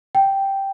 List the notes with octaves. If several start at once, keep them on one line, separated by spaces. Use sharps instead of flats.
G5